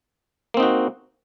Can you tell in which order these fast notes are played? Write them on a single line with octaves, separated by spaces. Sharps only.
A#3 C4 D#4 F#4